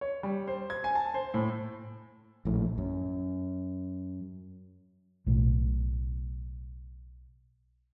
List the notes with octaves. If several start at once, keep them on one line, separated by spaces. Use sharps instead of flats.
C#5
G3
C5
G#6
G#5
A5
C5
A2
A#1 A2
F#2
B1 A2